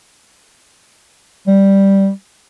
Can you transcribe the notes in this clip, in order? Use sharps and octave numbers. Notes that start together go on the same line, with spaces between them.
G3